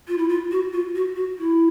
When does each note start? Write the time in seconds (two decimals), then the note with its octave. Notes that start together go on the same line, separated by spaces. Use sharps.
0.08 F4
0.18 E4
0.29 F4
0.51 F#4
0.73 F4
0.95 F#4
1.16 F#4
1.39 E4